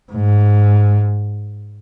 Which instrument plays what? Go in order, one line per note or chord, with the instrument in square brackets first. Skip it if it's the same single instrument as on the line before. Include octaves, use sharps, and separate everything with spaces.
[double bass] G#2